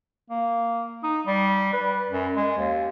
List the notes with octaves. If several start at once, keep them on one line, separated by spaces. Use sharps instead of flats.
A#3
D#4
G3
B4
F#2
G#3
D#2